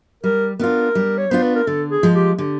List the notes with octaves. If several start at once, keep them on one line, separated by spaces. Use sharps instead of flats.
G3 A#4
B3 D4 F4 A#4
G3
C#5
B3 D4 F4 C5
B4
A#4
D3 A4
G#4
F3 G#3
G4
D3 G4